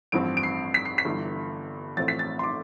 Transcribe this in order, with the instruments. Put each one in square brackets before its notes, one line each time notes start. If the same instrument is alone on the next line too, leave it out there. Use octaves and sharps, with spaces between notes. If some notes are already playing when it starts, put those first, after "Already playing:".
[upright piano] A1 G2 F3 C4 D7
D7
C7
B6
C7
B6
G1 G2 E3
A1 A2 F3 C4 A6
B6
A6
C6
D6